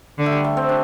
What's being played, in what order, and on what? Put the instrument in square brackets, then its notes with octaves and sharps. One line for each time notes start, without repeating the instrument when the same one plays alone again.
[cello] D3
[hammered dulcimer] A3
G3
A3
C4
D4